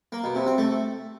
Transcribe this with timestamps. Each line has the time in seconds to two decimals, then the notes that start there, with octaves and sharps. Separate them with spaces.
0.12 A#3
0.24 B2
0.35 C3
0.47 C4
0.58 A3